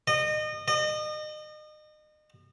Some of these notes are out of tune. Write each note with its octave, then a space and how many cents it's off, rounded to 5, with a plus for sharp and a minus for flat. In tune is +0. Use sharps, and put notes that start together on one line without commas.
D#5 -30
D#5 -35